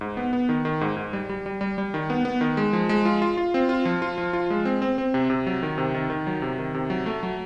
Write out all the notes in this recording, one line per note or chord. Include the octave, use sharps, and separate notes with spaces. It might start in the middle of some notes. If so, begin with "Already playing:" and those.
G#2
B3
B3
D#3
D#3
G#2
G#2
G3
G3
G3
G3
G3
D#3
B3
B3
D#3
G#3
F3
G#3
F4
F4
F4
C4
F4
F3
F4
F3
F4
G#3
C4
C4
C4
C3
C3
F#3
D#3
C3
D#3
D#3
F#3
C3
D#3
C3
F#3
A3
F#3